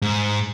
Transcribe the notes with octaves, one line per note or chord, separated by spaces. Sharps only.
G#2